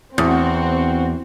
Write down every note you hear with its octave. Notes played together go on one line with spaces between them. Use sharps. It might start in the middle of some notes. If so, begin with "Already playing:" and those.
E2 C4 F#4